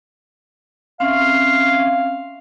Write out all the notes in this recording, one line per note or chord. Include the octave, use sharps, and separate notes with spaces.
C4 C#4 E5 F5